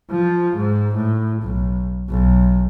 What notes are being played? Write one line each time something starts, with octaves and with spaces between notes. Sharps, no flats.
F3
G#2
A2
B1
B1